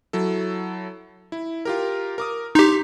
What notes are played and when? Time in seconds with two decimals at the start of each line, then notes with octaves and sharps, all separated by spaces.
0.13 F#3 E4 A4
1.32 E4
1.65 F4 G4 A#4
2.18 A#4 D6 D#6
2.55 D#4 G4 C6 G6 B6